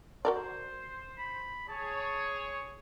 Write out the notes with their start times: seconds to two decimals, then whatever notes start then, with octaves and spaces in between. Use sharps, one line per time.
0.25 F#4 A#4 C5 D5
1.18 B5
1.69 G#4 C#5 A5